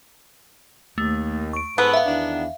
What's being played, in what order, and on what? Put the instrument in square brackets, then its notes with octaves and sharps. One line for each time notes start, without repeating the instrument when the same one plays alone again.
[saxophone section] D#2 [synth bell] A3
[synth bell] C#6 D7
[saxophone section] G#2 A4 B4 [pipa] B3
[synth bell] E5 F5
[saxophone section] E2 D#3 D4